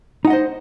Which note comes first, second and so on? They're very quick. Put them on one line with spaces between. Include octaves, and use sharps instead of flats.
D#4 F#5 D#5 C5